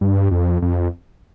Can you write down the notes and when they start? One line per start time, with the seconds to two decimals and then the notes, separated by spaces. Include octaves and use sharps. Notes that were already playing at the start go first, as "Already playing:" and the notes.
0.01 G2
0.31 F2
0.62 F2